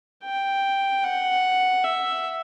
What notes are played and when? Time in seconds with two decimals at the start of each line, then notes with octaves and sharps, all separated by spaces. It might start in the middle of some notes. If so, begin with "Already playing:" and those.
0.24 G5
1.04 F#5
1.84 E5